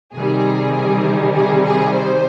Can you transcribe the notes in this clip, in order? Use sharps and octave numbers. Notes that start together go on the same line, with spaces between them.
C3 D#3 G3 G#4
G#4
G#4
C5